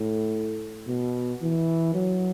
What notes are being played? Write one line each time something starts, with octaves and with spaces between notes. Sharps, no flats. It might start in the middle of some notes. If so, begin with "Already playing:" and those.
Already playing: A2
B2
E3
F#3